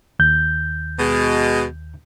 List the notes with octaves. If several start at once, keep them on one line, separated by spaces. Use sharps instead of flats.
D#2 G6
B2 G#3